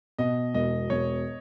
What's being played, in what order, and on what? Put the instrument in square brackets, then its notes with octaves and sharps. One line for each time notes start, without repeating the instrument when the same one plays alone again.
[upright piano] B2 [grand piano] D#5
[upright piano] E1 [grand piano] D#5
[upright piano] E1 [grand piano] C#5